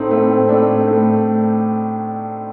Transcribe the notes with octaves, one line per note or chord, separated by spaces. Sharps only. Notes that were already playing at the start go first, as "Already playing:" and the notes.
Already playing: A2 A3 C4 D#4
A2 A3 C4
C4
A2 A3 D4
A2 A3